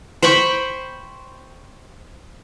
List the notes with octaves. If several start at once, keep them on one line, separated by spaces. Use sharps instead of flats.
C5 G5 B5 C#6